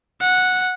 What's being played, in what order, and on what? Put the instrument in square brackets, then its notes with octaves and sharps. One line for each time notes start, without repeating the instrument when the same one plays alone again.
[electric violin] F#5